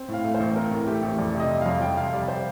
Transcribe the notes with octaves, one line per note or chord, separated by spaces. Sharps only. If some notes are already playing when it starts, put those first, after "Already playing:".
Already playing: C4
A2
F5
A3
C5
A1
C4 A#4
A2
A3 G4
A1
F2 D5
C3
D#5
G3
F2 F5
F2 G5
C3 F5
G3 D5
C5